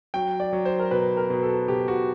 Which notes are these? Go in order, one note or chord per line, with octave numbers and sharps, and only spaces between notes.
F#3 G5
D5
F#3
C5
A#4
B2 B4
A#4
B2
A4
B2 G4
F#4